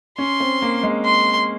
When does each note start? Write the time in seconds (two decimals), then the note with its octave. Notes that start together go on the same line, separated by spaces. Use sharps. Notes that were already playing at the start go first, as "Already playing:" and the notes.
0.18 C#4 C6
0.40 C4
0.62 A#3
0.83 G#3
1.05 C6